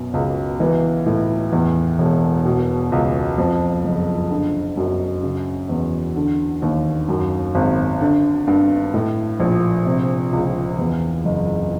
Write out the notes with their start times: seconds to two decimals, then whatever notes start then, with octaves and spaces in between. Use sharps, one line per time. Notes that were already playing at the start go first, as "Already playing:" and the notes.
Already playing: F#2 B2
0.14 C#2
0.60 E3
1.06 A2
1.53 E2
1.99 E1
2.45 B2
2.92 C#2
3.38 F2
3.84 F#1
4.31 D3
4.77 F#2
5.23 C#3
5.69 E2
6.16 D3
6.62 D#2
7.09 F#2
7.55 G#1
8.01 D3
8.47 G2
8.94 A2
9.40 A#1
9.86 C3
10.33 C#2
10.79 E2
11.25 F#1